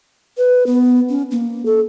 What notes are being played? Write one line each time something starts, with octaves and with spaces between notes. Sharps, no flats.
B4
B3
C#4
A#3
A4